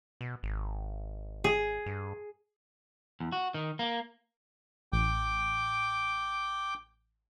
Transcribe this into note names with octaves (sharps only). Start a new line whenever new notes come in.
B2
G#1
G#4
G2
E2
F#4
D#3
A#3
A1 G5 D6